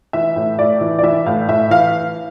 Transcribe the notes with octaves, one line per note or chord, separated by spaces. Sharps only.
E3 E5
A2
A2 D5
E3
D5
E3 E5
A2 F5
A2 E5
E3 F5